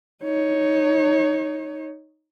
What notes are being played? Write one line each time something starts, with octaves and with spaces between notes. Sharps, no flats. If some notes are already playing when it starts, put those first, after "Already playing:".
D#4 C#5